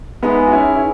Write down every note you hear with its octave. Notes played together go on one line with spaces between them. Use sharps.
G#3 B3 D#4 G#4 B4 E5
F#4
C#4 E4
E4